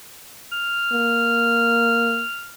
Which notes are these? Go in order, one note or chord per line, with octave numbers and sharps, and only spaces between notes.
F6
A#3